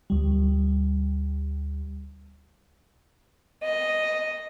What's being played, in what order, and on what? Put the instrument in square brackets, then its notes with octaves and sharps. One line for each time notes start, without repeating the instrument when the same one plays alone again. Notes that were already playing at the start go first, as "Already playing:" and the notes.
[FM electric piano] D2 G3
[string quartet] D#5